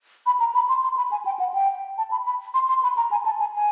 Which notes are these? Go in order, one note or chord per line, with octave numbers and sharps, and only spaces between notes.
B5
A#5
B5
C6
C6
B5
G#5
G5
F#5
G5
A5
B5
B5
C6
C6
B5
A#5
G#5
A5
G#5
G#5